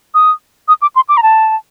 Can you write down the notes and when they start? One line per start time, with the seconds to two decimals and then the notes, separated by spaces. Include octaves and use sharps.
0.14 D#6
0.68 D#6
0.82 D6
0.96 C6
1.09 D6
1.17 A#5
1.23 A5